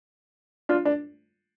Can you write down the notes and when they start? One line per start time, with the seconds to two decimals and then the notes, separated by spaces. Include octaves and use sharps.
0.69 D4 F4
0.85 D4